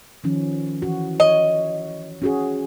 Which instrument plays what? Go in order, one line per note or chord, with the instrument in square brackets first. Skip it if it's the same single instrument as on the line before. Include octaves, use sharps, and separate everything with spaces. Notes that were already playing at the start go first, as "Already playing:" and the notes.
[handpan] D#3 F3 C#4
E3 F#4
[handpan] C#5 [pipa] D#5
[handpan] C#4 F#4 G#4